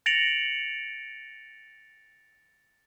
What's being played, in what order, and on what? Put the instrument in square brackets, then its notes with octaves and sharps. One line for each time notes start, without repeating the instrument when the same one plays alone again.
[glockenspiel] A6 A#6 C#7 D7 F7 F#7